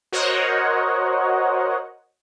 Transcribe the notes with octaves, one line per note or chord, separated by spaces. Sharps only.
F#4 A#4 C5 C#5 D#5 F#5